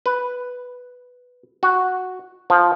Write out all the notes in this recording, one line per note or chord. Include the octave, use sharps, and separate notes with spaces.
B4
F#4
F3